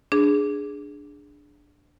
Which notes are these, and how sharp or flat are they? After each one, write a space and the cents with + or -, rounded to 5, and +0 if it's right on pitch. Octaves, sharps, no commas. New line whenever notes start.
D4 +0 G#4 +0